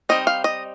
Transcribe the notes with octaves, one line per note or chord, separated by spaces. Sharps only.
G3 C4 D#4 D#5
F5
D#5